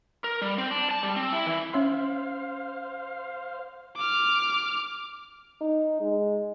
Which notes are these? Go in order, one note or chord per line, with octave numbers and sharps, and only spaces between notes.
A#4
G3
C4
D4
A5
G3
C4
E4
E3
C#4 C5 E5 F5 C6
D6 F6
D#4
G#3